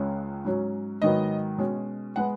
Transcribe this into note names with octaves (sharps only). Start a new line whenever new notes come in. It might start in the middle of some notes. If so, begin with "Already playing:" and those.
Already playing: C#2 C#3 G#3 C#4
G#2 F#3 C#4
G#2 D#3 F#3 B3 D#5
B2 G#3 C#4
G#3 B3 F#5